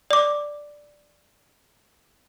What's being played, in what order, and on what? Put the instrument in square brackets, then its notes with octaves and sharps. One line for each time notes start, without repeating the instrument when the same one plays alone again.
[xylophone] D5 D6